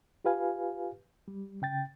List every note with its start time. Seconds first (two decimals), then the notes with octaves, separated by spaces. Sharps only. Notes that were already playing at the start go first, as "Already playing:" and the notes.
0.25 F4 G4 B4 F5 G#5
1.28 G3
1.62 C#3 G5 A6